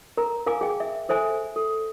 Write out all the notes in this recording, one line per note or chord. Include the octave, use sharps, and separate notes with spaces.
A#4 A#5
A#4 F5 G#5 D6
G#4 G5
E5
A4 C5 E5 G#5
A4